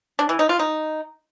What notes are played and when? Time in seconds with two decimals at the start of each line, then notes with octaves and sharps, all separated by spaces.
0.19 D4
0.29 E3
0.39 D#4
0.49 F4
0.59 D#4